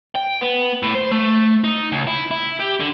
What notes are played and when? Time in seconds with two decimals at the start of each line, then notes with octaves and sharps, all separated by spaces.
0.16 G5
0.42 B3
0.83 A2
0.95 C5
1.12 A3
1.64 D#4
1.92 C#2
2.07 E4
2.31 E4
2.60 G4
2.80 D3